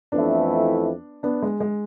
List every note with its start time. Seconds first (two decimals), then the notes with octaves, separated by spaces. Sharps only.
0.12 F2 E3 A3 B3 D4 E4
1.23 B3 D4
1.42 G#3
1.60 G#3